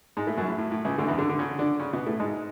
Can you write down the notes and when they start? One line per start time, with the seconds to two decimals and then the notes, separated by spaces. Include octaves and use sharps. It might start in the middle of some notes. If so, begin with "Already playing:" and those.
0.17 G#2 G#3
0.27 A2 A3
0.37 F#2 F#3
0.48 A2
0.58 A2
0.71 A2
0.85 C#2 C#3
0.98 D2 D3
1.08 E2 E3
1.18 D3 D4
1.29 D3 D4
1.39 C#3 C#4
1.59 D3 D4
1.80 C#3 C#4
1.93 B2 B3
2.07 A2 A3
2.20 G#2 G#3